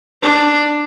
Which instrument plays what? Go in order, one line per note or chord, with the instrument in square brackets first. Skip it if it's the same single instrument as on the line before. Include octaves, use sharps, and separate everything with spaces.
[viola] D4